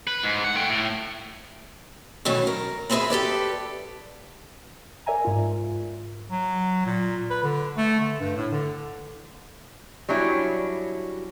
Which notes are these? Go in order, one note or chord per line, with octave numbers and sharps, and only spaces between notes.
B4
G#2
F#5
A3 G5
A2
B2 D#3 E3 F#3 A3 C#4
A#4
B3 C4 E4 G#4 B4 E5
G4 A4 B4 D5
A#4 D5 E5 G#5 A#5
G#2 F4
F#3
A#2
B4
D3
A3
D3
G2
A2
D3
F#3 G3 C#4 D4 E4